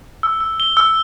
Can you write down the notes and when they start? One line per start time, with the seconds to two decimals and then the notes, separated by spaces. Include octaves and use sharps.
0.23 E6
0.41 E6
0.60 G7
0.77 E6